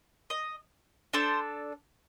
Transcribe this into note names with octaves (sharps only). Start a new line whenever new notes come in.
D#5
D4 A4 C5